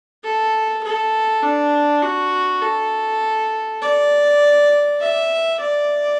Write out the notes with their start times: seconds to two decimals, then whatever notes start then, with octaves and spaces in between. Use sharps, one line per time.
0.24 A4
0.83 A4
1.43 D4
2.03 F#4
2.62 A4
3.82 D5
5.01 E5
5.60 D5